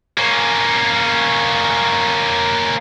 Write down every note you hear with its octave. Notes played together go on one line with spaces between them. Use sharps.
A#3 C#4